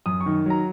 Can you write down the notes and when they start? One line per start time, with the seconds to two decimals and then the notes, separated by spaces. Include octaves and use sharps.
0.06 F#2 D#6
0.21 C#6
0.26 D#3
0.46 F#3 A#5